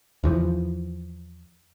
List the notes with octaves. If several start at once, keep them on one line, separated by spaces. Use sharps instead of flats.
E2 E3 F3